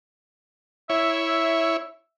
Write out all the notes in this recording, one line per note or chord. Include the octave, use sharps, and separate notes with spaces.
E4 C#5 E5